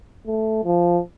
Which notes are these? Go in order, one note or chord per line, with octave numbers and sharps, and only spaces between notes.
A3
F3